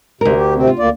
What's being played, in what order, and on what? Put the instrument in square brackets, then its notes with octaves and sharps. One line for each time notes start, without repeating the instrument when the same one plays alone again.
[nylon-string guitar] D2 A#4 [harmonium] C3
[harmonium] G4
C3 C4
[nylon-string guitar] F4
[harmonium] D2 A#3 D5